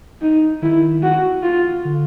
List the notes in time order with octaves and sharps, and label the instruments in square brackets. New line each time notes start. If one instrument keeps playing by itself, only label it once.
[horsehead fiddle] D#4
[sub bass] D#3 [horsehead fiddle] E4
[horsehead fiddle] F#4
F4
[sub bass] D3